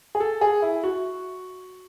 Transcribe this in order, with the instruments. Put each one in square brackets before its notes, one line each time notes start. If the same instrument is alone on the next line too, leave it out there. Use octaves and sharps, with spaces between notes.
[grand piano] G#4
A4
G#4
E4
F#4